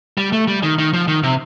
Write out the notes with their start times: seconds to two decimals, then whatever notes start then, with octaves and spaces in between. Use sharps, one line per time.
0.18 G3
0.32 A3
0.48 G3
0.63 D#3
0.78 D#3
0.93 F3
1.08 D#3
1.23 C3